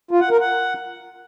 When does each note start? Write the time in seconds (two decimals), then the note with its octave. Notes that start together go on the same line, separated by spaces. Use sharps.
0.11 F4
0.21 F#5
0.31 A#4
0.40 F#5